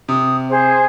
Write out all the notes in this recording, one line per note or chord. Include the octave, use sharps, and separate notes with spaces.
C3 D#6
G#4 C5